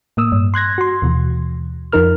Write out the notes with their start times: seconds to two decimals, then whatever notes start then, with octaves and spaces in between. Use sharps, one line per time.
0.17 A2 A#3 D#6 E6
0.32 G2
0.54 C6 F#6 G#6 A#6
0.78 F#4 C6
1.02 D#2 B2 E3
1.92 F2 F3 D#4 A#4 F6